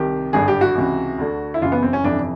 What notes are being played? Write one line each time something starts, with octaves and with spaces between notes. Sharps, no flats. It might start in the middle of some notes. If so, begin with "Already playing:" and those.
Already playing: C2 C3 D#3 G4
G#1 G2 D3 G#4
G4
F#4
C#2 C3 E3
D2 D3
E4
F#1 F#2 C#3 E3 F4
B3
C4
C#4
G1 F2 C3 E3 D4